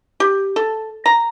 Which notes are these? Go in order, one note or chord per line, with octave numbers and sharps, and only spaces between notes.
G4
A4
A#5